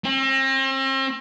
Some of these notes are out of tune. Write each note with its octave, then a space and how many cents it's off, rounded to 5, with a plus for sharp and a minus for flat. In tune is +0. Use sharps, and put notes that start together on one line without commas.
C4 +40